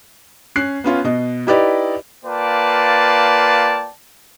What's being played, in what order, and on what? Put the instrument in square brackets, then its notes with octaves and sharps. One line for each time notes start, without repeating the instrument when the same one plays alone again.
[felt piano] C#4 F#6 C7
B3 C#4 F4
B2 D#5
D#4 E4 G4 B4 D5 D#5
[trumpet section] A#3 F4 B4 D5 G5 A5